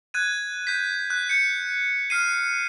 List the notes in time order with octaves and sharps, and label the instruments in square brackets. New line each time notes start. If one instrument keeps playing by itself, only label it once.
[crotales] F#6 G#6 D#7
G6 B6
F#6
G6 C#7
F6 C7 D#7